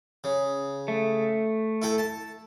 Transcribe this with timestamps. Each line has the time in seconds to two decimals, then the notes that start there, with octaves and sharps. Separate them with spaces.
0.24 C#3
0.88 A3
1.82 E4 A4 G5
1.98 A5